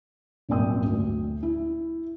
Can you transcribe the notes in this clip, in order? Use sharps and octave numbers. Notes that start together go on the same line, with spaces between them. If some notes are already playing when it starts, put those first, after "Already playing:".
D#1 G#1 F#2 D5 G5 D#6
D2
E4